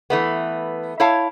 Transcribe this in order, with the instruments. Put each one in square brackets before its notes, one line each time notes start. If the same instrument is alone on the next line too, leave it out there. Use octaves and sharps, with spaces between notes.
[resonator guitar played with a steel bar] E3 A3 B3
E4 C#5 F5 A5